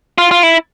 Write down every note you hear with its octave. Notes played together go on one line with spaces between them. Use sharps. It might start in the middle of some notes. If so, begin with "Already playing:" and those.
F4
F4
E4